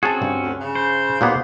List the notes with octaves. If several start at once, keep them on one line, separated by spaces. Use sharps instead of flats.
C4 C#4 F#4 G#4 A5
G2
D2
C#3
C5
D#2 A#2 A#3 B3